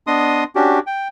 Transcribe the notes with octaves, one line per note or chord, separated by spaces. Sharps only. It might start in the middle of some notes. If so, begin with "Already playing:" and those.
B3 D4 D#5 C6 D#6
C#4 D4 F#4 G4
G5